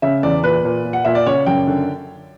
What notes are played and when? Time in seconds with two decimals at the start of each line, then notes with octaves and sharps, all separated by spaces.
0.02 C#3 E5
0.23 E2 D5
0.43 A#2 B4
0.65 A#2
0.85 A#2
0.93 F#5
1.05 A#2 E5
1.15 D5
1.26 C#3 C#5
1.46 F#2 G5
1.67 D3